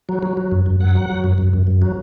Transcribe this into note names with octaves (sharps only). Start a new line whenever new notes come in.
F#3
F#3
F#3
F#2
F#2
F#2 F#5
F#3
F#3
F#2
F#2
F#2
F#2
F#3